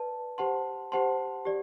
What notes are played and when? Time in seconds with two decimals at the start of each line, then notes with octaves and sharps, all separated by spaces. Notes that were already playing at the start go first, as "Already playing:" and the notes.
Already playing: B4 D5 A5
0.38 G4 C5 F#5 A5 C6
0.92 G4 C5 F#5 A5 C6
1.45 G4 D5